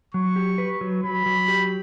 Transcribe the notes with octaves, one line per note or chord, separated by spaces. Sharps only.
F#3 C#6
G4
B4
F#3
F#3 B5
F#3
G4